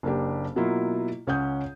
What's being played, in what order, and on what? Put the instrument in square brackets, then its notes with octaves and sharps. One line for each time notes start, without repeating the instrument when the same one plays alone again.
[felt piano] F#1 A#3 D4 G4
B2 F#3 A#3 E4 F4
C#2 C#4 C#5 F#5 D#6 G6